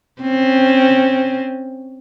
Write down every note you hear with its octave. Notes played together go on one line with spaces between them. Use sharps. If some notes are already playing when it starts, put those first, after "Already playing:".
C4 C#4